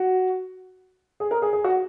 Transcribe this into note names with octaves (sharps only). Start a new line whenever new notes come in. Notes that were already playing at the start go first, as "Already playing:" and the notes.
Already playing: F#4
G#4
A#4
G#4
G#4
F#4